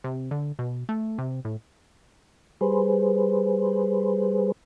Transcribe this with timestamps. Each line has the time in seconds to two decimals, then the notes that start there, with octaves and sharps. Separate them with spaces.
0.04 C3
0.31 D3
0.59 B2
0.89 A3
1.18 C3
1.45 A2
2.61 G3 G#4 B4 C5